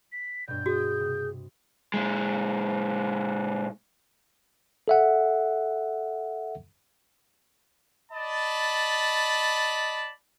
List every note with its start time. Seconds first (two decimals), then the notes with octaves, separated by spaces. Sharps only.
0.12 B6
0.48 G2 B2 G6
0.66 F#4 G#4 D#6
1.00 C3
1.94 A#2 G#3
4.88 A4 E5 F#5
8.11 D5 D#5 A5 B5